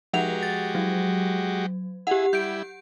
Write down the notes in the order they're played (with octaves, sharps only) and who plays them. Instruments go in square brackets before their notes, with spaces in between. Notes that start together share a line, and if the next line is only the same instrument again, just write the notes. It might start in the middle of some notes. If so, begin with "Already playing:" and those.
[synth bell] F3 F#5 F7 [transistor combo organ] G#3 F#4 G4
[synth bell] A6
F#3
[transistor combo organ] E4 G#4 [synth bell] G4 F#5
[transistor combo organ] G3 E4 [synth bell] G6 D7